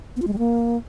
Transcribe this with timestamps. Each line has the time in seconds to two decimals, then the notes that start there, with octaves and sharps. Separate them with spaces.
0.16 B3
0.22 F4
0.27 G#3
0.33 G3
0.38 A#3